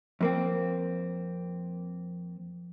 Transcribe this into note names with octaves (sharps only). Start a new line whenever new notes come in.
F2 A#3 C4